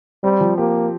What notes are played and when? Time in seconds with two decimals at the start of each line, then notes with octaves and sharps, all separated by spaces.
0.23 G3 C4
0.41 F3
0.58 A#3 G4